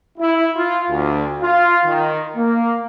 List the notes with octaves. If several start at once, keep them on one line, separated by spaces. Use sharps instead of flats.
E4
F4
D2
F4
D#3
A#3